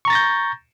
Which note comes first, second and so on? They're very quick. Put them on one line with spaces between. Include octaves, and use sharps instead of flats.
C#6 A#5 A6 A#6 G6